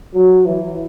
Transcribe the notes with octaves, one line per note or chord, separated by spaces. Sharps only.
F#3
E3